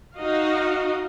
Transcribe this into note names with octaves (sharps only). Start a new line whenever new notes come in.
D#4 F#4 D#5 F5